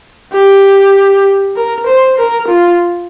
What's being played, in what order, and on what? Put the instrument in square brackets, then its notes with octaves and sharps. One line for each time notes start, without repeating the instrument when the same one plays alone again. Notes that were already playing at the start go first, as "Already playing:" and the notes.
[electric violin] G4
A#4
C5
A#4
F4